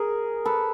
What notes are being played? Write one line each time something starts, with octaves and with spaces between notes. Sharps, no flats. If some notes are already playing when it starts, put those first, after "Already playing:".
Already playing: G#4 A#4
A4 B4